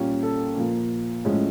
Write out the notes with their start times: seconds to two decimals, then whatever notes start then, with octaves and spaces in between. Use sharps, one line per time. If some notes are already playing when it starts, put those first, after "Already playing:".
Already playing: A#2 G3 A#3 C#4
0.23 A4
0.57 A#2 F3 A#3
1.25 A2 F3 G#3 C#4